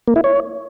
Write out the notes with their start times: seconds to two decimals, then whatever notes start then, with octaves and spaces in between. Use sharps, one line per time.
0.08 A#3
0.16 E4
0.24 C#5